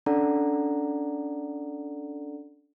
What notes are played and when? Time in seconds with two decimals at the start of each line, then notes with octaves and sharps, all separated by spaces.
0.06 C#4 D4 A4 D5 F#5 A#5